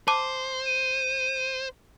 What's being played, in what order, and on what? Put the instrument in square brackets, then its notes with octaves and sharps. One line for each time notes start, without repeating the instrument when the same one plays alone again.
[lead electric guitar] C5 [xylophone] A5 D6
[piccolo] D#7